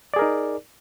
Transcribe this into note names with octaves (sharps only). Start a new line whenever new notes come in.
D#4 G#4 A#4 D5